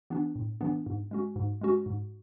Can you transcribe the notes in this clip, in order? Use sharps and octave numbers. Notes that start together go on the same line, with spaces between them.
E3 B3 D4
A2
E3 B3 D4
G#2
G#3 C#4 F#4
G#2
G#3 C#4 F#4
G#2